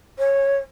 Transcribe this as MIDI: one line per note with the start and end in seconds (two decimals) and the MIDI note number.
0.18 0.57 73